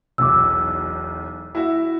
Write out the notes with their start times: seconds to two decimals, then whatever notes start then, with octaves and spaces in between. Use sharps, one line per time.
0.18 E1 B1 D6 E6
1.55 E4 F#4 E5